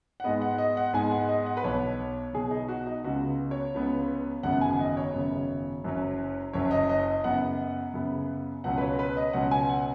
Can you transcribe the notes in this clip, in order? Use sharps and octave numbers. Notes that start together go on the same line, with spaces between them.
F#5
G#2 G#3 B3 D#5
F#5
D#5
F#5
G#2 G#3 B3 G#5
F#5
D#5
F#5
B4
B1 B2 B3 C#5
B1 B2 B3 G#4
D#4
F#4
D#4
C#2 C#3 B3 F#4
C#5
C#2 C#3 B3
G#1 F#2 C#3 B3 F#5
G#5
D#5
C#5
G#1 F#2 C#3 B3
F#1 F#2 F#3 C#4
F#1 F#2 F#3 C#4 C#5
D#5
D#5
D#5
F#2 C#3 B3 F#5
F#2 C#3 B3
C#2 B2 F#3 C#4 F#5
B4
C#5
B4
D#5
C#2 B2 F#3 C#4 F#5
G#5
F#5